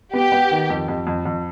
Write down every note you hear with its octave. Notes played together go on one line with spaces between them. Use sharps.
B3 G4
B3
D#3
F2
F2
F2
F2